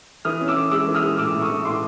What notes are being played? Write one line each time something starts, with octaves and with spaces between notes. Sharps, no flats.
E3 D#6 F6
C#4
D6 E6
E3
G#3 D6 E6
E3
D#6 F6
G#3
A2 D6 E6
A2
C#6 D#6
E3
A2 C6 D6